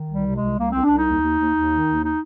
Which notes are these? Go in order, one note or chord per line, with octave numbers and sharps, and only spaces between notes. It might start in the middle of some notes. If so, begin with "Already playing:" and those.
Already playing: D#3
C2 G3
C3
G#3
C2
C2 A#3
C2 C4
D4
C2 D#4
D#2
D#2
D#2
D#2
D#3
D#2
D#4